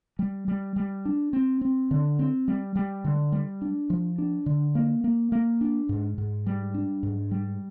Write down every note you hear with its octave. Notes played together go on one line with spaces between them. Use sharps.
G3
G3
G3
D4
C4
C4
D3
C4
G3
G3
D3
G3
D4
F3
D4
D3
A#3
A#3
A#3
D4
G#2
G#2
G3
D4
G#2
G3